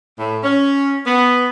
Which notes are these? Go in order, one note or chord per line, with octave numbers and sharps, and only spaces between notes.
A2
C#4
B3